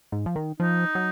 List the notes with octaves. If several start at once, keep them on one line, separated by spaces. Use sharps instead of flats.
G#2
F3
D#3
F3 D#4
F#3